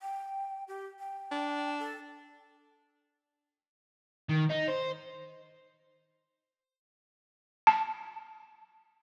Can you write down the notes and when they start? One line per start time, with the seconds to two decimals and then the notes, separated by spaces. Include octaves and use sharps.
0.02 G5
0.68 G4
0.99 G5
1.31 D4
1.79 A4
4.29 D#3
4.50 D#4
4.68 C5
7.67 A5